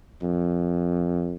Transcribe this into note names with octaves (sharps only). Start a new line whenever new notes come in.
F2